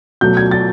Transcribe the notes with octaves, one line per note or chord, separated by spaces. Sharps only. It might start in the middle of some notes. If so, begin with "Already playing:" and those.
B2 F#3 A3 G6
G#6
A6